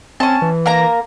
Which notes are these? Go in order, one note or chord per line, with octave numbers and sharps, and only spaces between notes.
C4 C#4 A5
E3
A#3 A#4 A#5